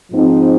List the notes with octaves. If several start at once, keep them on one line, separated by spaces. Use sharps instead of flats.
G#2 F3 C4 D#4